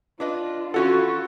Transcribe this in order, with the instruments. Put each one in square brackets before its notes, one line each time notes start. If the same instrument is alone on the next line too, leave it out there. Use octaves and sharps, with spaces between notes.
[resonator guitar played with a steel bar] D4 B4 D#5 [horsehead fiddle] F4
[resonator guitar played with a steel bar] E3 C#4 F#5 [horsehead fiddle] F4 [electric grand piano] F#4 A4